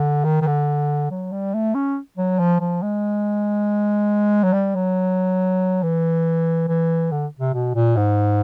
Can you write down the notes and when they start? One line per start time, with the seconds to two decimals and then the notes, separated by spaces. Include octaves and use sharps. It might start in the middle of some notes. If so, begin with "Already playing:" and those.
Already playing: D3
0.24 D#3
0.41 D#3
0.47 D3
1.10 F#3
1.32 G3
1.54 A3
1.74 C#4
2.18 F#3
2.39 F3
2.60 F3
2.82 G#3
4.43 F#3
4.53 G3
4.75 F#3
5.83 E3
6.68 E3
7.11 D3
7.39 C3
7.54 B2
7.75 A#2
7.96 G#2